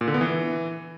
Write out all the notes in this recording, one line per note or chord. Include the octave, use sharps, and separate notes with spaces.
A#2
D3
B3
E3